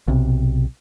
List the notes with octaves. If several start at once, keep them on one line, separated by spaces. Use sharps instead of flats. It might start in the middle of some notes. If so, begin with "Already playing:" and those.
B1 C3